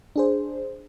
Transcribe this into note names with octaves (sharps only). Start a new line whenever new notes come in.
D4 G#4 C5